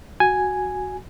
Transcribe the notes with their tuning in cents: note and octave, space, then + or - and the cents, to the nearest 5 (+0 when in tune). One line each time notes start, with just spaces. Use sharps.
F#4 +0 G#5 +0